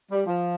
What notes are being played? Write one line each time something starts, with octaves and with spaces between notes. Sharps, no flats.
G3
F3